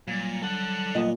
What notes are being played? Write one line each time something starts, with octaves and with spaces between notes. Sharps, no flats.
A#2 F#3 G3
A4 F#5
A#2 B3 D#5